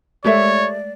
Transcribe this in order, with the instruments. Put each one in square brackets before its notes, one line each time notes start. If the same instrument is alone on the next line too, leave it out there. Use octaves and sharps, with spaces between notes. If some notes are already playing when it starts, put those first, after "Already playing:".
[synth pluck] G#3 A3 A#4 [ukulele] G4 A4 E5 [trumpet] C#5 [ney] D5